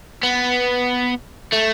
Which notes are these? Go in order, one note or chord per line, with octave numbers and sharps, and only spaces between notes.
B3
A3